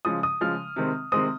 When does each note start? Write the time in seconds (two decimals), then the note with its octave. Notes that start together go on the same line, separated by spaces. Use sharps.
0.05 C#3 F3 G#3 D#6
0.23 D#6
0.41 C#3 F3 G#3 F6
0.76 C3 D#3 G#3 C4
1.12 C3 D#3 G#3 C4 D#6